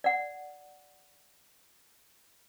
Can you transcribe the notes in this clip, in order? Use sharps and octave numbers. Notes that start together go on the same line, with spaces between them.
D5 F#5